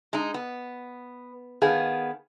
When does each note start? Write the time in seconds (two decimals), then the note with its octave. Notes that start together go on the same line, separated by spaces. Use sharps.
0.13 G#3 D#4
0.34 B3
1.62 D#3 B3 G#4 F5